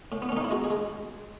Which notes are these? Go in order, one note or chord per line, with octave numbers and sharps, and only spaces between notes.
A2
B3
C#4
A2 D#4
E4
G#3 F#4
G#4
G#3